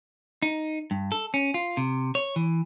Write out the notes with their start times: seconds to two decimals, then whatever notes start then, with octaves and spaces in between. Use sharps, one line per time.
0.42 D#4
0.91 G2
1.12 A4
1.34 C#4
1.54 F4
1.77 C3
2.15 C#5
2.36 E3